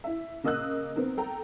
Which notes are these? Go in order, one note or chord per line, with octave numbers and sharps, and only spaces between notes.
E4 E5
C#3 A#3 D#5 D#6 E6 F#6
B3 C4 D#4 A#4
A4 G5 A#5